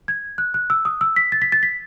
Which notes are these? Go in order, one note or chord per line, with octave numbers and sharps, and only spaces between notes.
G#6
F#6
F#6
E6
D#6
E6
B6
A6
B6
A6
B6